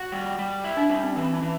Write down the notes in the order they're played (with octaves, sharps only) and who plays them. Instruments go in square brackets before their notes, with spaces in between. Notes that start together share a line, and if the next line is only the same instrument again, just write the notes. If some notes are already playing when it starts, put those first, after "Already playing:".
Already playing: [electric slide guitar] F#4
G3
G3
E4
[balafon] D4
[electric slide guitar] G3 [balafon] C#4
[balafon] C4
[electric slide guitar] E3 [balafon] C4
[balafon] C#4
[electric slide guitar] E3